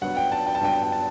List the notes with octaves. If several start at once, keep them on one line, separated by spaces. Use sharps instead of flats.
G2 F#3 B3 F#5
G5
A5
G5
A5
G2 F#3 B3 G5
A5
G5
A5